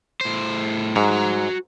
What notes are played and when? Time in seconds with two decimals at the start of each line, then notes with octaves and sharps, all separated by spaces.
0.21 A2 C5
0.96 G#2 F#4 A#5